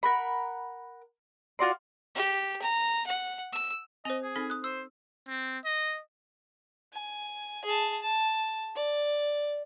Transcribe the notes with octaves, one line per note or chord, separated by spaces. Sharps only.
A#4 F#5 B5
F4 F#4 D5 C6
G4
A#5
F#5
E6
C4 C5 D#5 F7
G#4
C4 D#4 A4 B6
D#6 F#6
C5 E6
C4
D#5
G#5
G#4 A5
A5
D5